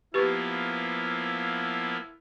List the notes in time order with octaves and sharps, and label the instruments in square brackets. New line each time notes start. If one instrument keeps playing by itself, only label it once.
[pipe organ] F3 A#3 B3 [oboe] E4 [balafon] G4 B4 C#6